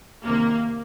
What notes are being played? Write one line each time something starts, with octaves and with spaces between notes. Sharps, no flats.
C2 C3 D#3 A#3